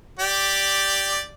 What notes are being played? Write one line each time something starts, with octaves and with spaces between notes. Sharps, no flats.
G4 D5